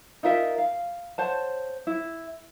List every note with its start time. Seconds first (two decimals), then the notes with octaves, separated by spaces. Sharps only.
0.23 D#4 F4 A#4 E5
0.58 F5
1.18 C5 C#5 F#5 A5
1.87 E4